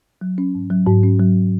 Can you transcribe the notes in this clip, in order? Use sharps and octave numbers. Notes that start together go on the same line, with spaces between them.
F#3
C#4
G#2
F#3
G#2
C#4
F#3